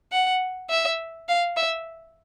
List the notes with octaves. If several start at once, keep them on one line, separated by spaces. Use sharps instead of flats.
F#5
E5
F5
E5